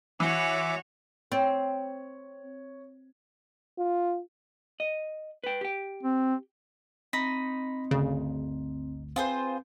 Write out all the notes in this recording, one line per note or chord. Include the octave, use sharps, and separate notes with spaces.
E3 F#4 C#5 E5 D6
C4 C#5
F4
D#5
B4 G5
G4 G5
C4
C4 D#4 B5 A#6 B6
G1 D2 C#3
C4 F4 G#4 B4 C5